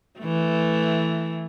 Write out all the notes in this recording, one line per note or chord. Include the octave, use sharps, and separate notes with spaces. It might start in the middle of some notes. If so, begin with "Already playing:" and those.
E3 A3